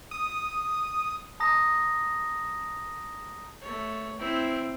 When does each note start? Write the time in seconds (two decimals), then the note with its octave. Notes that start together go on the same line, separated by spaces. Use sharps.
0.11 D#6
1.40 A5 A#5 D#6 A#6
3.61 A3 C#5
4.18 C4 E4